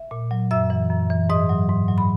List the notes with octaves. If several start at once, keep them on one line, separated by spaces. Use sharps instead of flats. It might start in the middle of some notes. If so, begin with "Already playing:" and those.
Already playing: E5
A#2
F#3
F#2 E5 E6
E3
F#2
E3
G#2 D#5 D#6
F#3
G#2
F#3
B5